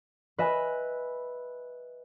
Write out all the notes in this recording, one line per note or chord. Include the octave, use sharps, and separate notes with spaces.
B4 D#5 E5 G#5